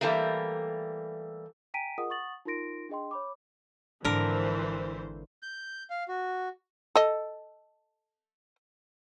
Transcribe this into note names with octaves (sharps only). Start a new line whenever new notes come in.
E3 G3 A3 A#3
G5 G#5 A#5 B6 D7 D#7
F4 G#4 A#4 D#5 F#5 D#6
F#5 C#6 D#6 A6 F#7
D#4 F4 A#4 C6 A#6 D7
D4 G#4 D#5 G5 C6
C#5 B5 D6
G#1 D3 E3 F3 A#4 C5
G6
F5
F#4
A4 D#5